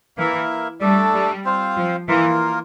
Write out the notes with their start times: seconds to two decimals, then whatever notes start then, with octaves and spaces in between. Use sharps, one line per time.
0.17 E3 A#3 E4 A#4 E5
0.80 G3 A3 D4 A4 D5
1.13 G3
1.44 C4 F4 C5 F5
1.77 F3
2.08 E3 A#3 F4 A#4